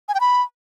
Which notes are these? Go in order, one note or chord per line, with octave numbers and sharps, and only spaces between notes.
G#5
G5
B5